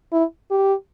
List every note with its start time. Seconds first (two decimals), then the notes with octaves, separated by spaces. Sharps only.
0.12 E4
0.51 G4